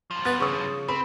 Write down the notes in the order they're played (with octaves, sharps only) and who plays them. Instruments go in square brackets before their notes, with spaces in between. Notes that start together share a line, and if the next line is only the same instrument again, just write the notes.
[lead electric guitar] G2 F3
[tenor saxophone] B3 [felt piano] A6
[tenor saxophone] C#3 [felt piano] C#6 D#6
[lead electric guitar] C4 [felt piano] B5